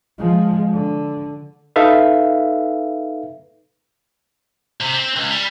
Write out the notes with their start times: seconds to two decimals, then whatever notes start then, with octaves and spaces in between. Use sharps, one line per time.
0.18 F3 G#3
0.72 D3
1.76 D#4 A4 B4 E5 F5
4.81 C3
4.94 C4
5.16 C#2
5.30 G3